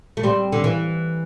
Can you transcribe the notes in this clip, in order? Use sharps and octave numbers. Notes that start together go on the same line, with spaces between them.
A3
G3 C4
D3
E3